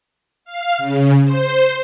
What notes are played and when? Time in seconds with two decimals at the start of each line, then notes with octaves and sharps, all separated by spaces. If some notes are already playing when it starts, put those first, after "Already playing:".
0.45 F5
0.78 C#3
1.24 C5